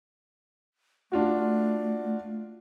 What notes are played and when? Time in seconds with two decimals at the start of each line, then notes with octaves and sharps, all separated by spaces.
1.12 A3 D4 F4 F#4